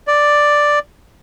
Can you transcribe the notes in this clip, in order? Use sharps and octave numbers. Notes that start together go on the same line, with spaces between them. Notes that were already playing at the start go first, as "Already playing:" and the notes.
D5